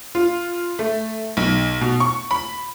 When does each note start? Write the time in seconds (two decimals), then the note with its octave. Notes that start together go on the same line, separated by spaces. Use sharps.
0.15 F4
0.79 A3
1.37 B1
1.81 B2
2.00 C#6
2.31 B5